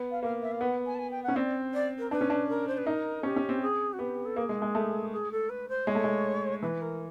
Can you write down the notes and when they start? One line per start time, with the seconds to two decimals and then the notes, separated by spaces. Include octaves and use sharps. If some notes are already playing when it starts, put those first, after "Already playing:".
Already playing: B3
0.10 F5
0.23 A#3 F5
0.42 E5
0.51 F5
0.60 B3 F#5
0.86 G#5
0.94 A5
0.98 G#5
1.11 G5
1.23 F#5
1.28 C#4
1.36 C4 D5
1.73 D5
1.98 A#4
2.11 D4 B4
2.21 C#4
2.30 D4
2.48 A#4
2.67 C5
2.77 B4
2.86 D#4 A#4
3.23 C#4 G4
3.36 C#4
3.49 C4
3.61 G#4
3.93 F#4
3.99 B3 G4
4.25 A4
4.36 A#3 G#4
4.49 G#3
4.62 G#3
4.75 A3
5.12 G#4
5.31 A4
5.49 B4
5.68 C5
5.87 G#3 C#5
5.95 A3
6.04 G#3
6.62 E3 B4
6.81 A#4